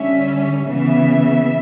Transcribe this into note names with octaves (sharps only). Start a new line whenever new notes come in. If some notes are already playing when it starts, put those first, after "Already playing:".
Already playing: D3 G3 C#4 E5
C#3 E3 B3 E5